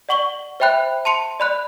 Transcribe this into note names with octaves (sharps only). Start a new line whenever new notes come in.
D5 F#5 C#6 F#7 G7
C5 E5 G5 B5 F#6
A5 C6 C#7 F7
D5 B5 F#6